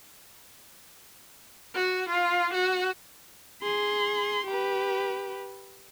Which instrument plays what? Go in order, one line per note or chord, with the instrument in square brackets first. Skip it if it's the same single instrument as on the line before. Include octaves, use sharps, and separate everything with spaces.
[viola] F#4
F4
F#4
[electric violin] G#4 C6
G4 B4